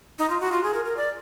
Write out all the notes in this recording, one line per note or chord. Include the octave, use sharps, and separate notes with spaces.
D#4
F4
F#4
F4
G#4
A#4
A#4
D5